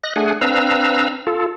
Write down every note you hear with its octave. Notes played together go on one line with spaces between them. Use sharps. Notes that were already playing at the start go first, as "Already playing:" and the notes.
D#5 F#6 A#6
A3 D4 G#4 F#5 G#5
C4 D4 B4 F5 A#5 E6
F4 A4